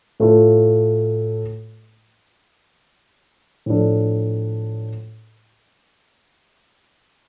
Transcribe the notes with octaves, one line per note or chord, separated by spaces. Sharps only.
A2 A3 F4 A4
A2 F3 D4 A4